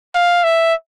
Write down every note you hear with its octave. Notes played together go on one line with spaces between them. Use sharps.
F5
E5